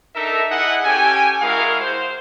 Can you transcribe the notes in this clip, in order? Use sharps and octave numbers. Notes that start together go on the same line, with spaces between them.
D4 D#4 A4 A#4 E5
E4 G#4 D#5 F#5
C#4 G4 A4 G5 G#5
G#3 E4 F#4 G#4 A#4 F5
C5